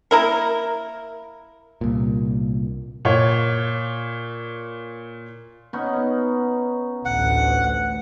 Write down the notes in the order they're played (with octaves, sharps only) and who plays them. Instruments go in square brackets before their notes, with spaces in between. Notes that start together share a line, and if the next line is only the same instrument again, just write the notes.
[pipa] A#3 E4 A#4
[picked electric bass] C2 A#2
[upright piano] A#2 C#5
[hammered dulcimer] B3 C#4 D#4
[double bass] A1 D2 [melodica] F#5